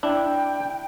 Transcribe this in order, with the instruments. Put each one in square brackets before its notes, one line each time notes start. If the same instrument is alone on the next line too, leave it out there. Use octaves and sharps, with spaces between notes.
[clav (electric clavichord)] D4 E4 [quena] G5